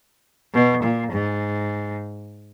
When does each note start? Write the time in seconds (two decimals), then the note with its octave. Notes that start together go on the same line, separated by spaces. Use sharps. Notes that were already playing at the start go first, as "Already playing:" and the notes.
0.54 B2
0.83 A#2
1.12 G#2